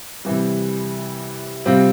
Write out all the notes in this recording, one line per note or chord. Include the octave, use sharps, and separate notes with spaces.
C3 E3 G3
C3 G3 C4 F4